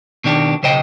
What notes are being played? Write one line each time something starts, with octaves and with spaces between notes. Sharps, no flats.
B2 D#3 D4 G4
B1 C#3 C5 D#5 G5